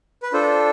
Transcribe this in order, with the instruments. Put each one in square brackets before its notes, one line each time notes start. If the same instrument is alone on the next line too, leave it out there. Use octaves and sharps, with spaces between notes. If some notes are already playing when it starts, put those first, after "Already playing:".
[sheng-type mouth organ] B4
D4 F4 A4 C5